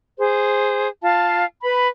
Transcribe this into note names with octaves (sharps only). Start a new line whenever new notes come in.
G#4 C5
F4 F5 A5
B4 B5